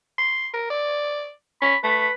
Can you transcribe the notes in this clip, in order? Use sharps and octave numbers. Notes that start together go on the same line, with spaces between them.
C6
A#4
D5
C#4 B5
A3 B4